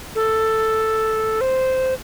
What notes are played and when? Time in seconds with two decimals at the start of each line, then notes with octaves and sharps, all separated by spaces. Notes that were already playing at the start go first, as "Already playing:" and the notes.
0.15 A4
1.41 C5